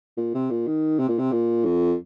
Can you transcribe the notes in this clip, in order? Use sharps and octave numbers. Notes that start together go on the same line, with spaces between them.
A#2
C3
A#2
D#3
C3
A#2
C3
A#2
F2